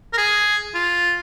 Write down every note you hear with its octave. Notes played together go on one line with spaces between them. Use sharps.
A#4
G#4
F4